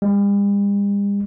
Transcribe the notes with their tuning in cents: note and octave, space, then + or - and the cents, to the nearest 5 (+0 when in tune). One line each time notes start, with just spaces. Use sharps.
G3 +45